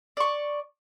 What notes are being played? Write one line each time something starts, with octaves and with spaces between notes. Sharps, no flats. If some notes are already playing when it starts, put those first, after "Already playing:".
D5 C#6